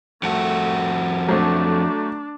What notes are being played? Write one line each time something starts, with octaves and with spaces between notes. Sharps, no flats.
F2 A3 F#4
F#3 A3 D4